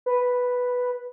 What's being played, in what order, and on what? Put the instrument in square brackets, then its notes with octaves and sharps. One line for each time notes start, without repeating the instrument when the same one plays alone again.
[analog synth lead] B4